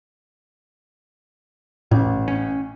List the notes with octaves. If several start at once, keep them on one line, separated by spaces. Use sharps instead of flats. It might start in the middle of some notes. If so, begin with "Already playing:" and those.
A1 A2
C#4